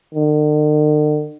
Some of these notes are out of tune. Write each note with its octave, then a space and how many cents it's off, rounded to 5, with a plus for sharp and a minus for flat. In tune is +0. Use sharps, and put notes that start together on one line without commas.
D3 +45